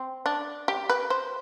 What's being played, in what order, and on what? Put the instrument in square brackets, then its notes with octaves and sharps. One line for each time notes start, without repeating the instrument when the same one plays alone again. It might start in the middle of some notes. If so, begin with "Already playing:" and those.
Already playing: [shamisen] C4
D4
G4
B4
C5